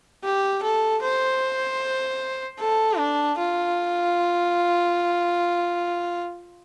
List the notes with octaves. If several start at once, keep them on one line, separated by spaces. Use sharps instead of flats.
G4
A4
C5
A4
D4
F4